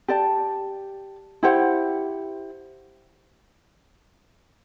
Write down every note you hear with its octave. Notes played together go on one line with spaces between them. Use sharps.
G4 D5 A5
E4 G4 C5 F#5